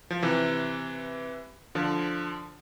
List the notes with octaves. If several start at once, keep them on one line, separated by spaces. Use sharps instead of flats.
F3
C3 E3
D3 F3